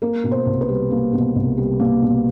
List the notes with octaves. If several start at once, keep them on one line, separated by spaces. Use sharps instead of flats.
A#3 A#4
B2
C5
C2
B4
G3
A#3
B2
C2
G3
A#3
B2